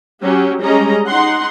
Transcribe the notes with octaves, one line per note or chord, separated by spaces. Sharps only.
F#3 C#4 G4
G3 G#3 C#4 D#5 A#5
D#4 F#5 C6